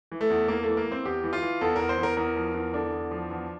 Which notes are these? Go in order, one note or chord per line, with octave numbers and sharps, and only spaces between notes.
E3
A3
E2
E2 A#3
E3 A3
A#3
E3 C4
E2 G4
E3
F4
E3
E2 A4
E2 A#4
C5
E2 A#4
E2 A#4
F3
E2
D3 D4
E2
F3
E2